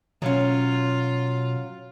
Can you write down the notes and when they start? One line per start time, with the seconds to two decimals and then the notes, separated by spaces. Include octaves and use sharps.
0.22 B2 F#3 C#4 F4